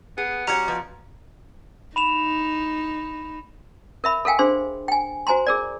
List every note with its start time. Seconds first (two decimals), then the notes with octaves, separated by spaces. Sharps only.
0.18 B3 G#4
0.47 G3 C#4 F#4 C#5 F#5 A#5 G#6
0.68 B2 F3
1.96 D#4 B5 E7 F7
4.04 A#4 E5 B5
4.25 A4 A#4 F5 G5 G#5
4.39 D4 G#4 C5 C6
4.88 G5 G#5
5.27 F#4 C5 G#5 A#5 C6
5.47 G#4 A#4 D5